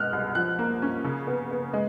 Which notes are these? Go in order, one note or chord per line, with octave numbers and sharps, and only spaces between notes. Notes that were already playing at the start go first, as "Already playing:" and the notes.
Already playing: B2 G#3 F6 F#6
C2
F3 F#6
A#3
C#4
C#3
B3
B3
G#3